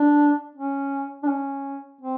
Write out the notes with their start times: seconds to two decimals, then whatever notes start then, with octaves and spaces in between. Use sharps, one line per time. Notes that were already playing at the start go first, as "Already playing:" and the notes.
Already playing: D4
0.55 C#4
1.23 D4
1.28 C#4
2.01 C4